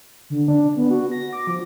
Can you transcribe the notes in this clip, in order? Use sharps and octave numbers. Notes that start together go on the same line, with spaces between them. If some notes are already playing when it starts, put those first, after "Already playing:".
D3
D4
B3
F#4
A#6
D6
F3